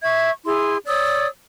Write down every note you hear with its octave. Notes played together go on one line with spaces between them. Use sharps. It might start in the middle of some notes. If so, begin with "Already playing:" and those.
E5 C#6 G#6
E4 G#4 C6
C#5 D5 D#6 E6